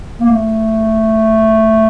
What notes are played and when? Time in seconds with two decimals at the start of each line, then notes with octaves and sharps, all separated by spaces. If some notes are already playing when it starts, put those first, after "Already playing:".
0.20 A#3
0.28 A3